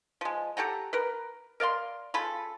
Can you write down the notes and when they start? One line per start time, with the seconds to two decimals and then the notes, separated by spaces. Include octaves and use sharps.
0.21 F3 G#3
0.57 G4 A4 F#5 A#5
0.93 A#4 B4
1.60 A#4 D5 F5 C6
2.14 C#3 F4 A4 B5